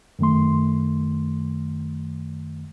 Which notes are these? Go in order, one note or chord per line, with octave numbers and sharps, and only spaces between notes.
F#2 D#3 A3 C6